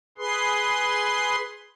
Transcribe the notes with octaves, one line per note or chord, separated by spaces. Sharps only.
G#4 B4 C6